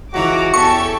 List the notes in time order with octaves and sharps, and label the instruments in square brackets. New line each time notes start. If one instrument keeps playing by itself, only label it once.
[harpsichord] C#2 E3 [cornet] F#4 [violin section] A#5 D6
[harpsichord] E2 C#4 [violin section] G4 A4 [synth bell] C#6